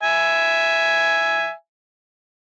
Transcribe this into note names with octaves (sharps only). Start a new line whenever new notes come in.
E5 G#5